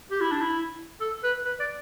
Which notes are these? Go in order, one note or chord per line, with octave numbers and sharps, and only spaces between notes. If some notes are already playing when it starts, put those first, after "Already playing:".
G4
E4
D4
E4
A4
B4
B4
D5